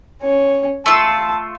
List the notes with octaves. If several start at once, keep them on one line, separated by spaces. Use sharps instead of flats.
C#4 C#5
A3 F4 A5 E6